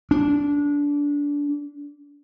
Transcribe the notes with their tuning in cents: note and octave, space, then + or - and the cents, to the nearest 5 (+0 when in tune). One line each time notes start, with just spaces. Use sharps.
D4 -20